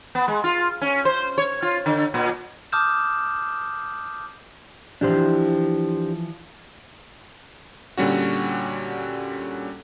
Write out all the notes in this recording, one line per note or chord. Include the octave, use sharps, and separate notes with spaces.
B3
G#3
F4
C#4
C5
C#5
F4
D3
A#2
A5 D6 D#6 F6 G6 E7
E3 F3 D4 G4 C5
A#2 D3 G3 C#4 F#4